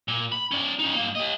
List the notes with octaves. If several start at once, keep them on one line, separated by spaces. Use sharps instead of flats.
A#2
B5
C#4 D5
C#4 D#4
G2 A#3
G4 D#5